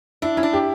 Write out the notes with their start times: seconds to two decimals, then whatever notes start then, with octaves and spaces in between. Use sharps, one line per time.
0.22 D4 E4
0.37 C#4 E4
0.43 D4
0.53 G4